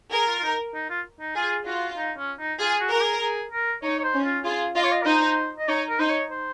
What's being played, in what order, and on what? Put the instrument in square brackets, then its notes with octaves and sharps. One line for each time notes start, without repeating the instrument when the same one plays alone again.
[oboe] G#4 [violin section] A#4
[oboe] F4
F4
D#4
D#4
F4
D#4
[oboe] F4 [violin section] G#4
[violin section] F4 [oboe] F#4
[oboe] D#4
C#4
D#4
[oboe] F4 [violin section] G#4
[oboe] F#4
[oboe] F#4 [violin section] A#4
[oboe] G#4
G#4
A#4
[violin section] D#4 [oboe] C#5
[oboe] C#5
C5
[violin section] C#4
[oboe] F4
[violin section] F4 [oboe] G#4
[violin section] F4 [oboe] D#5
[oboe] C#5
D#5
A#4
[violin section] D#4 [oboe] C5
[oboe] D#5
[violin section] D#4 [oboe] C#5
[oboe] A#4
[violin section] D#4 [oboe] C5
[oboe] C#5
C5